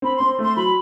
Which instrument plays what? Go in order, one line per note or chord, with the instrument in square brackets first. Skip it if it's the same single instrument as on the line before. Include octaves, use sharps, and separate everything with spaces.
[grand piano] C4 [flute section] B5
[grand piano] C4 [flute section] C6
[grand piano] A3 [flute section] C6
[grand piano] F#3 [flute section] B5